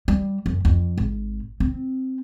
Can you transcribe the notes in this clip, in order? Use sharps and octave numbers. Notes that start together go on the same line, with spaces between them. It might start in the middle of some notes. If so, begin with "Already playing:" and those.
G3
F#2
F2
G#1
C4